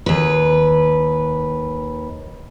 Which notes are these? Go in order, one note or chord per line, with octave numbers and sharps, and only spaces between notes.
D#2 B4